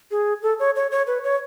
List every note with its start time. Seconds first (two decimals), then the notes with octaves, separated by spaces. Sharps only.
0.11 G#4
0.42 A4
0.59 C#5
0.76 C#5
0.91 C#5
1.07 B4
1.24 C#5